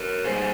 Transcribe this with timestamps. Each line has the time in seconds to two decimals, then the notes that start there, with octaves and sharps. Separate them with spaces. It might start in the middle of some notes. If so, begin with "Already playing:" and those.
Already playing: A#4 C#5
0.24 A#2 G3 G#4 C5